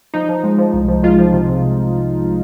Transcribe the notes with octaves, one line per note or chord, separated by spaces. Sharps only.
F3 D#4
F3
G#3
F3
C2
F3
G#3 F4
F3
C3
C3